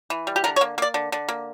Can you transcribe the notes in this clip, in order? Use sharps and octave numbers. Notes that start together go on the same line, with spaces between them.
E3
G3
G4
D3 A#4
C#5
A#3
A#3 D5
D3
D3
A#3